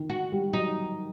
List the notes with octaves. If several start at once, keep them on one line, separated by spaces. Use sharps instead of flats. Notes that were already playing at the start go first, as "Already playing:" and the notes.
Already playing: D#3
F#4
G3
F#3 D#4